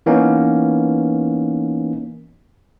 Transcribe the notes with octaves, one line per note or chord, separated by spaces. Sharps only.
E3 A#3 B3 C#4 D#4